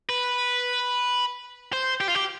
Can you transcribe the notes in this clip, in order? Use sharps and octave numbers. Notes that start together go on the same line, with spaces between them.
B4
C5
G4
F4
G4